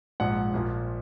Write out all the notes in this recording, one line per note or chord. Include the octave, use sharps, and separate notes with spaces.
A#1 G#2 F3 F#5
A#1 A#2 F3